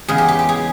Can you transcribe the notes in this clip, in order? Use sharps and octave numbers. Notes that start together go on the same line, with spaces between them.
E2 C#3 G#3 G#4
G4
G4
G4
G#4